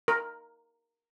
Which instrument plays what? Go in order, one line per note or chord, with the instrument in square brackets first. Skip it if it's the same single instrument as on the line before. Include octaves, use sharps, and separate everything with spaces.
[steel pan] A#4